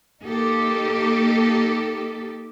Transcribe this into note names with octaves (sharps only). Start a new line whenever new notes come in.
A#3 D#4 G4 A4